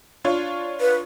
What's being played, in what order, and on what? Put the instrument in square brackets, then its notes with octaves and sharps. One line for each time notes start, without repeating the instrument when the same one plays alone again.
[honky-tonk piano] D4 F4 C#5
[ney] B4